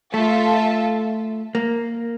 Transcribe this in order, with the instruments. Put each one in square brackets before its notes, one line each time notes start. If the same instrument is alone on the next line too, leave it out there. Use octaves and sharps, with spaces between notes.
[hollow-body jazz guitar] A3 [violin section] F4 A4 E5 A5
[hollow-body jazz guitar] A#3